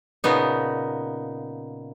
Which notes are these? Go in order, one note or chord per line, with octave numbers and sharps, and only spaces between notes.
A#2 C#3 B3 D#4